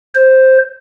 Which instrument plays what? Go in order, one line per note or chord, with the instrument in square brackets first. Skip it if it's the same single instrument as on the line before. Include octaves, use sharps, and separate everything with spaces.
[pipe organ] C5